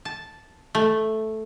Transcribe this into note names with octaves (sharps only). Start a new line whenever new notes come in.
A5
A3